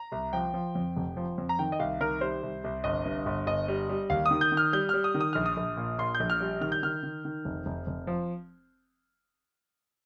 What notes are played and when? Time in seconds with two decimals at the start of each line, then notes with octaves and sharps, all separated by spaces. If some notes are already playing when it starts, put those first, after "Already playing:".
Already playing: A#5
0.12 C2
0.33 F3 G5
0.54 F3
0.75 F2
0.97 F1
1.17 F3
1.38 F2
1.49 A#5
1.59 D#3 G5
1.72 D#5
1.79 C2 F5
2.01 D#3 A#4
2.21 G3 C5
2.43 C2
2.64 C2
2.84 G1 D#5
3.05 G2
3.26 G1
3.47 G1 D#5
3.68 G3
3.89 G3
4.10 D#2 F5
4.26 D#6
4.31 D#3
4.41 G6
4.52 D#3
4.57 F6
4.73 G3 G6
4.89 G3 F6
5.04 D#6
5.14 D#3
5.21 D#6
5.33 A#1 F6
5.46 D#6
5.57 A#1
5.77 A#2
5.98 A#2 C6
6.15 G6
6.20 A#1
6.30 F6
6.40 G3
6.61 D#3 F6
6.72 G6
6.83 D#3 F6
7.03 D#3
7.25 D#3
7.45 F1
7.66 F1
7.87 F1
8.07 F3